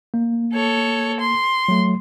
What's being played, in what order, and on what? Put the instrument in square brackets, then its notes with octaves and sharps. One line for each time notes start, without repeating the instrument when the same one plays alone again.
[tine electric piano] A#3
[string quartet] A4 C#5
C6
[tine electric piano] F#3 A3